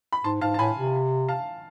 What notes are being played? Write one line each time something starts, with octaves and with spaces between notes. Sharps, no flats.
B5
G#2 A5 C6
G#2 F5 A5
A5
A2 G#5 B5
C3
F5 A5